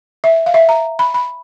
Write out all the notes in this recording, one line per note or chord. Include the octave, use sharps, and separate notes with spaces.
E5
F5
E5
A#5
B5
B5